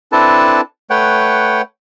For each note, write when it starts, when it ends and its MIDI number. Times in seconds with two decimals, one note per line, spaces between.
0.12 0.61 60
0.12 0.61 62
0.12 0.61 64
0.12 0.61 69
0.12 0.61 71
0.12 0.61 81
0.90 1.62 57
0.90 1.62 71
0.90 1.62 73
0.90 1.62 78
0.90 1.62 79